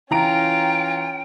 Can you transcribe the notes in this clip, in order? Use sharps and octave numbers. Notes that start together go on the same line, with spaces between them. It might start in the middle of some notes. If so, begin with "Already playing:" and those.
E3 C#4 F4 G5 A#5 D7